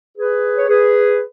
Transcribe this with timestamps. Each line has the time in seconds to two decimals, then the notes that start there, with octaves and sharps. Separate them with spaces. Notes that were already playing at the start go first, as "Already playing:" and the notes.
0.16 G#4 B4
0.57 C#5
0.68 G#4 B4